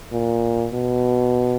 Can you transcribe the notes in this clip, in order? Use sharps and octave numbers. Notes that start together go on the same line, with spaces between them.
A#2
B2